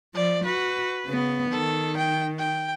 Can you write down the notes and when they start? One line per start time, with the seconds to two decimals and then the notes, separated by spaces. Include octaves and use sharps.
0.15 F3 D5
0.45 F#4 B4
1.07 C#3 B3
1.52 D#3 A4
1.97 G5
2.38 G5